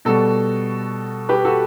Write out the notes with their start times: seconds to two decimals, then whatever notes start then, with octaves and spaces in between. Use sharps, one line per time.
0.05 B2 G3 F#4 A4
1.29 G4 B4
1.45 F#4 A4